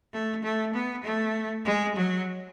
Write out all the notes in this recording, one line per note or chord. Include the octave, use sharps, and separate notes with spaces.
A3
A3
B3
A3
G#3
F#3